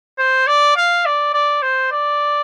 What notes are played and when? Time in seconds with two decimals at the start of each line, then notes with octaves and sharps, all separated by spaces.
0.19 C5
0.47 D5
0.77 F5
1.06 D5
1.34 D5
1.62 C5
1.92 D5